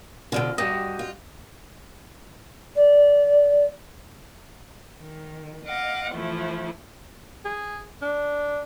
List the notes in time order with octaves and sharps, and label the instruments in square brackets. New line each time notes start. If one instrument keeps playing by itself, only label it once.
[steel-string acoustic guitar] G#2 B2 D3 [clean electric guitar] F4
[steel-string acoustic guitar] G2 [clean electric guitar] F#4 G4 D#5
[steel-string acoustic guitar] F4
[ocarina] D5
[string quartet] D#3
D#5 F5 F#5 D6
E3 F3 A3 E4
[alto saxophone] G#4
D4